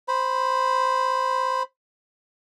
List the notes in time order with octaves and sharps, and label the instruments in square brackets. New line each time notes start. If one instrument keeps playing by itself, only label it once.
[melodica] C5 B5